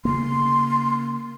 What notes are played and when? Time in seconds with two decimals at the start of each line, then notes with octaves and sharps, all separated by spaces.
0.05 C#3 A#3 C6